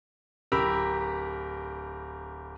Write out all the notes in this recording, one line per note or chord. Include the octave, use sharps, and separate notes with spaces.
D1 G4 A#4 A#5 B5 E6